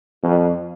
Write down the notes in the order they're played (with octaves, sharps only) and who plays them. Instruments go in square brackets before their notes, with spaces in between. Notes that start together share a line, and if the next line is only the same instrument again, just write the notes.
[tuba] F2